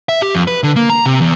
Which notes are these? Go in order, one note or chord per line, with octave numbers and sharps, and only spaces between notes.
E5
G4
F2
B4
D3
A#3
A#5
C3
E2